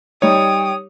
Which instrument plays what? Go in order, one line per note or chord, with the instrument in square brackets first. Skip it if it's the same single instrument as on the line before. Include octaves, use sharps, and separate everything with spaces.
[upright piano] G3 D#4 [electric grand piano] C#5 [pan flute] G5 [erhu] D#6